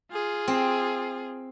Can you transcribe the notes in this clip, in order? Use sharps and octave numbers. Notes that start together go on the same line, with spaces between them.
F4 G#4
C4